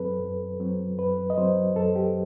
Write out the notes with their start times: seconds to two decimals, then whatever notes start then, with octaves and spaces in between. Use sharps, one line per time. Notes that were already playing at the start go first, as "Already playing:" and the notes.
Already playing: F#2 F#3 C4 A4 B4
0.20 F#2
0.60 F#3 C4
0.98 F#2 B4
1.30 D#5
1.37 F#3 C4 C5
1.76 F#2 A4
1.96 G4